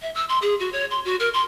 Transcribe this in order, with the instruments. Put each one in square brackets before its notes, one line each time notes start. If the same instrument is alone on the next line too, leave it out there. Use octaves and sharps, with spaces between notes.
[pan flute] E5
E6
C6
G#4
F#4
C#5
C6
F#4
A#4
C6